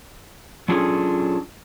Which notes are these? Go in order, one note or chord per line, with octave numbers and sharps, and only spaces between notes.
F#3 C#4 D4 F4 G#4 A4